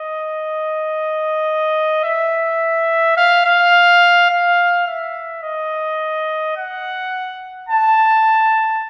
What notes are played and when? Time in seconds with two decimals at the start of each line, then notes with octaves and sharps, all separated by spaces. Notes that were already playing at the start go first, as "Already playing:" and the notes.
Already playing: D#5
2.04 E5
3.17 F5
3.45 F5
4.29 F5
4.87 E5
5.43 D#5
6.56 F#5
7.69 A5